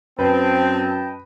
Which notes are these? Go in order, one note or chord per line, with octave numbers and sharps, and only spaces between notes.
F#2 C4 B4 D#5 G5 A5